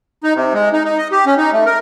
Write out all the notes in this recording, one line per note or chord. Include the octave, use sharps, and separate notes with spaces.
D#4
C3
G#3
D#4
D#4
D#5
G4
C#4
D#4
A3
A#4